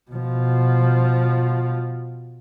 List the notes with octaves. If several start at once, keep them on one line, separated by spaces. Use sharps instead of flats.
B2 F3